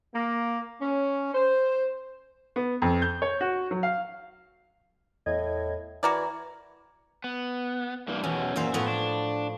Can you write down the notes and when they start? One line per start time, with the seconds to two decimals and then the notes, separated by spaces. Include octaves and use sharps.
0.14 A#3
0.80 C#4
1.34 C5
2.56 B3
2.82 F2
3.02 G6
3.22 C#5
3.41 F#4
3.71 F#3
3.83 F5
5.26 E2 A2 D#5 G#6
6.03 E3 F#4 A#4 D5 G#6
7.24 B3
8.08 G2 E3 A#3
8.24 E2 B2 C#4
8.56 F#2 A#2 E3 C5
8.74 A2 F3 B3 B4
8.88 D4